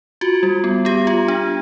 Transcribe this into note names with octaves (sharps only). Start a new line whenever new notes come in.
F4 F#4
G3
B3
B3 G4
F4
D4